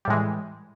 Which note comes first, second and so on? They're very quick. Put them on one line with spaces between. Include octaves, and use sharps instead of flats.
G3 A2 G#3 E3